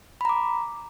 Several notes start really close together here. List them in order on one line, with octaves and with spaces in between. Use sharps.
B5 A#5 D6